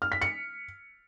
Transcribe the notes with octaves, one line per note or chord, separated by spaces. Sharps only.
F6
B6
C#7